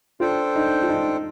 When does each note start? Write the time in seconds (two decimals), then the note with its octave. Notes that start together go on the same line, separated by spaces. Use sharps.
0.20 D4 F4 A4 C5 G5
0.56 D#4
0.83 F4
0.89 D#4